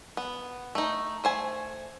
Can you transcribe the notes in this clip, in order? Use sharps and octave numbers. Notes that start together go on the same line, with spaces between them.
B3
A3 D#4
A3 C5 G#5